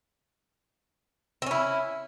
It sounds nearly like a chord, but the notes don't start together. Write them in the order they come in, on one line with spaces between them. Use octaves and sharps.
C4 C#4 E4